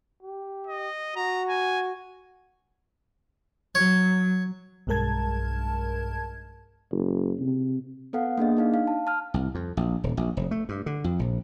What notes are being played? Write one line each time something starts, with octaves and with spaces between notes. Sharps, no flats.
G4
D#5
F#4 A#5
G#5
F#3 C#5
B1 G2 G#3 A#4 A5 G#6
F#1
C3
B3 A4 F5 F#5
A#3 D4 G#4 D#5
D4 D#4 F5
F5
A5
A5 F6
C2
F2
A#1
D#1
A#1
F1
A3
G2
D3
F2
A#1